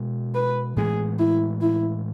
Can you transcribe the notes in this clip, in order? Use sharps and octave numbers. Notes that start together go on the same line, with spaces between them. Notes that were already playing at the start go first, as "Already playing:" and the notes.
Already playing: B2 G#3 B3
B4
A2 E3 G#3 B3 G#4
E4
E4